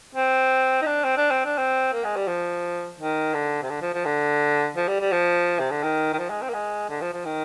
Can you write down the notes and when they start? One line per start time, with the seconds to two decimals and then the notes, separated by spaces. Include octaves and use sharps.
0.15 C4
0.82 D#4
0.86 D4
1.04 C4
1.17 D4
1.31 C4
1.45 D4
1.58 C4
1.93 A#3
2.04 G#3
2.16 G3
2.27 F3
2.99 D#3
3.34 D3
3.62 C3
3.70 D3
3.82 F3
3.94 F3
4.05 D3
4.76 F3
4.88 G3
5.00 G3
5.12 F3
5.59 C3
5.71 D3
5.83 D#3
6.13 D#3
6.19 F3
6.30 G#3
6.42 C4
6.49 A#3
6.54 G#3
6.89 D3
7.01 F3
7.13 F3
7.25 D#3